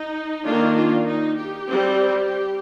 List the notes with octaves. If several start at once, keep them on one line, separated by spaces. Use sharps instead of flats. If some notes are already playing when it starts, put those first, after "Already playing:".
Already playing: D#4
D#3 A#3 D4 F4
F4
D#4
G4
G3 C4